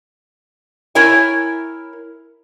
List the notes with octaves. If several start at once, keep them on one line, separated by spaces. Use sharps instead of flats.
E4 A#4 C#5 G#5